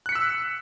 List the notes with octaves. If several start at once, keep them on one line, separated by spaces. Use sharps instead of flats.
E6 F#6 B6 C#7